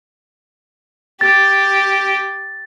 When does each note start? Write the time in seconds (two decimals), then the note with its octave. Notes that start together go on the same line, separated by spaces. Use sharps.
1.21 G4 A6